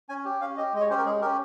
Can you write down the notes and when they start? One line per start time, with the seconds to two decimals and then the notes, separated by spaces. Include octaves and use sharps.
0.09 C#4 G#5
0.25 G4
0.41 C#4 F5
0.57 G4 D#5
0.73 G#3 D#5
0.81 C#5
0.90 C#4 G4 C5
0.98 A#4
1.05 G#3 G#4
1.21 G4 A#4
1.25 C#4